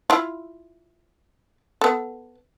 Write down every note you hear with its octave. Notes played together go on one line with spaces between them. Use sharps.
E4 F4
B3 A4